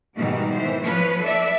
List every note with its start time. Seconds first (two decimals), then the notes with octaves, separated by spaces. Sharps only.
0.16 G#2 B2 D#3 E3 G3
0.52 E3 C5
0.82 F3 B4 C#5
1.23 A4 D5 E5